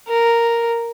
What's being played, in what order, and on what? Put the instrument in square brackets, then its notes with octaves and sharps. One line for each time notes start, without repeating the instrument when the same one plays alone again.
[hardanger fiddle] A#4